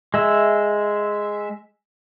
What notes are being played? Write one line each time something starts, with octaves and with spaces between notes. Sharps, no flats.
G#3 E5